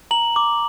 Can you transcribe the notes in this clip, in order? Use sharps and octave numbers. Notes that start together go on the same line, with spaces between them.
A#5 F#7
D6